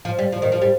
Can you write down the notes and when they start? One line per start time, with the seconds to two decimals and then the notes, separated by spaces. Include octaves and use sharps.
0.05 F3
0.19 G3
0.32 F3
0.42 D#3
0.52 F3
0.62 G3